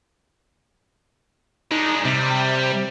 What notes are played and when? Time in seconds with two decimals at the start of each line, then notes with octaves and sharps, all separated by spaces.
1.71 G#3 D4 D#4
2.05 C3 G3